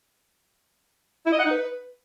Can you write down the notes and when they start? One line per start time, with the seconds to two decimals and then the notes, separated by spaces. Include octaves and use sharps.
1.26 E4
1.33 D#5
1.39 F#5
1.45 D#4
1.51 B4